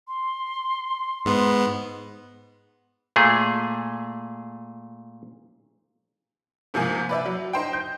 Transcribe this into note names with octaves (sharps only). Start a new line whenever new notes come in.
C6
G#2 B3
A#2 A3 G#4
G#2 C3 F3 A#3 G#5
B4 D5 E5
F#3
D#4 C5 G5
G6